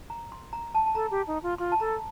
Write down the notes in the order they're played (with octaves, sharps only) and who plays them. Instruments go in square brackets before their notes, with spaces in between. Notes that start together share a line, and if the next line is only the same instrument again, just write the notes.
[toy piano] A#5
C6
A#5
A5
A5
[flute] A4 [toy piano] A#5
[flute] G4
D#4
F4
[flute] F4 [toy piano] C6
[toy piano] A5
[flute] A4 [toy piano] A#5